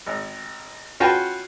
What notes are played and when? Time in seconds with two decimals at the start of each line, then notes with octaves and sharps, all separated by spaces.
0.06 G#1
1.00 C#4 F4 F#4 B4 G5 A5